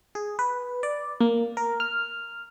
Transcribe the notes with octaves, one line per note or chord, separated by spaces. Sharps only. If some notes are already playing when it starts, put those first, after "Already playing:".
G#4
B4
D5
A#3
A#4
F6